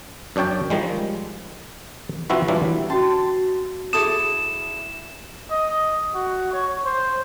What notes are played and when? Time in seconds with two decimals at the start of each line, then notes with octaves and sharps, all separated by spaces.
0.36 F#2 D4 C#5 G5 A5
0.70 D#3 F3 G3 G#3
2.30 C3 F3 C4 E4 F#4 B4
2.48 E3 F#3 G3 D4 E4 F4
2.90 C#4 F#4 A5 C6
3.93 E4 G#4 A4 D6 D#6 E7
5.51 D#5
6.15 F#4
6.53 C#5
6.86 C5